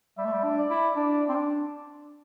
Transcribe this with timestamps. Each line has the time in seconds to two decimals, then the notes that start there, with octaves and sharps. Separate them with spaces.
0.18 G3 E5
0.25 A3
0.33 G3
0.43 D4
0.58 D5
0.70 E4
0.96 D4 D5
1.29 C4
1.35 D4